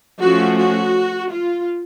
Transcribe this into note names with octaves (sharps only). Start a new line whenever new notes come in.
F3 A3 C#4 F#4
F#4
F4